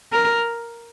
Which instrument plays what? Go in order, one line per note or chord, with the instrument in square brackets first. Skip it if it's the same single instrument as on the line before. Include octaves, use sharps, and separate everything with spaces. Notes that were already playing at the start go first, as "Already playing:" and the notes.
[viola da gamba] A#4